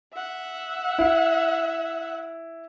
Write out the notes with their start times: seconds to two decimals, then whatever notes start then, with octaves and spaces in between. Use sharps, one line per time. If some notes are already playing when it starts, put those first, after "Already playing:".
0.14 E5 F#5
0.99 E4